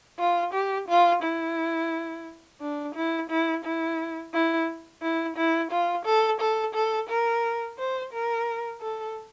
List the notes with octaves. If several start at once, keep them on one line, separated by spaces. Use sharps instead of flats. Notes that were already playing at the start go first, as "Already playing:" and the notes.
F4
G4
F4
E4
D4
E4
E4
E4
E4
E4
E4
F4
A4
A4
A4
A#4
C5
A#4
A4